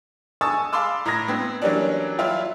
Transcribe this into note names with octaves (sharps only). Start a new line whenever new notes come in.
G#5 A5 C#6 D#6 E6 A6
F5 A5 B5 C6 D6 E6
A2 A#5 B5 D#6 G#6 A#6
B3 C4
E3 F#3 G3 A#3 C#4 D4
F#3 G3 E4 F4 G4